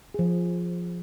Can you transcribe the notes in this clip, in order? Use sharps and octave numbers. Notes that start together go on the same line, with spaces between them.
F3 G#4